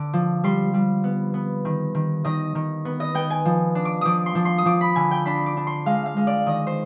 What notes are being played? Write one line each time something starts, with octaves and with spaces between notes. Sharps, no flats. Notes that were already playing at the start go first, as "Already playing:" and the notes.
Already playing: D3 D6
F3
G3 C6
G3
B3
B3
D#3
D#3
D#3 D#5
D#3
B3
D#5
B3 G5
G#5
F3
D4
D6
F3 D6 D#6
C6
F3
C6
D#6
F3 D6
B5
D3 G#5
G5
D4 B5
D6
D4
C6
G#3 F5
F5
G#3
D5
D#3 D#5
C5